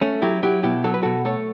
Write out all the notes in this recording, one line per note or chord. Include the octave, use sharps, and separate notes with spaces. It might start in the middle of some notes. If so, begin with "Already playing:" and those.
A3 C#4
F#3 E4 G4
F#3 E4 G4
B2 E4 G4
F#3 A4
B4
B2 F#4 A4
A3 A4 C#5